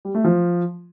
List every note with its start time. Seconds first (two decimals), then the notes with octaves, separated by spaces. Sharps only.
0.05 G3
0.15 A3
0.24 F3